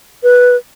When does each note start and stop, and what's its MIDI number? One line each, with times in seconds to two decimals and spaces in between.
0.23 0.56 71